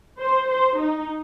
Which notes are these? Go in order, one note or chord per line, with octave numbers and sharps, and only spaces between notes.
C5
C5
D#4